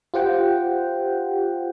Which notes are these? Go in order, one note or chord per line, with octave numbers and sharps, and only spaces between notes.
F4 G4 C5 F#5 G5